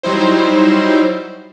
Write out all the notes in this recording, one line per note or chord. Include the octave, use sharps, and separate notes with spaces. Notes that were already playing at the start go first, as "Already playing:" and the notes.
F#3 G3 D#4 E4 C5